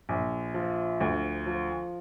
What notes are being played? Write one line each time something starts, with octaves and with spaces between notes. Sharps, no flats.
A#1
F3
D2
F3